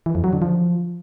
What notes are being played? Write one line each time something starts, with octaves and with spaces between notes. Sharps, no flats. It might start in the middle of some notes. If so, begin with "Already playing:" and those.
E3
F2
F#3
D3
F3